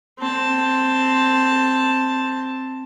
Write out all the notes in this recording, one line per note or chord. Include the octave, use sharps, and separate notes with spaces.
C4 A5